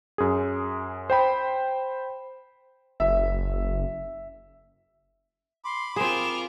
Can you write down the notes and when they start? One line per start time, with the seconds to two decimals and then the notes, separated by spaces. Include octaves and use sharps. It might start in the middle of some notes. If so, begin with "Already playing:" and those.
0.18 F#2 G#4
1.10 C5 G5 B5
3.00 F#1 E5
5.64 B5 C6 D6
5.96 C4 F4 G#4 A#4 E7